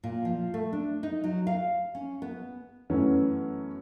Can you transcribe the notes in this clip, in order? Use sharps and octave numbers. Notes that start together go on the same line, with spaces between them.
A#2
F3
A3
D4
D#4
F#3
F5
C#4
B3
F#2 E3 A3 B3 C#4